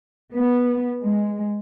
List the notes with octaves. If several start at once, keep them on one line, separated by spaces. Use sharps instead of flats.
B3
G#3